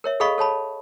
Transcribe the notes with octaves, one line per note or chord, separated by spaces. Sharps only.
A#4 C#5 E5
G#4 A4 D#5 F5 B5 C#6
A4 C#5 A5 B5